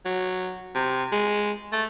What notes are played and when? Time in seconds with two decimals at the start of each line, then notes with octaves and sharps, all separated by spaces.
0.05 F#3
0.75 C3
1.12 G#3
1.72 A3